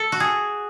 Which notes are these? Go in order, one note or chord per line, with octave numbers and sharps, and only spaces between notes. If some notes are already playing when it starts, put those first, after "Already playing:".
Already playing: A4
F#4
G#4